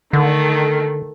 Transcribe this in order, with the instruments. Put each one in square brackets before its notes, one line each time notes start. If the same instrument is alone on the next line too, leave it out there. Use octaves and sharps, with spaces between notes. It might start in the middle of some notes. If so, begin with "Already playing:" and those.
[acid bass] D3 [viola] D#3 A3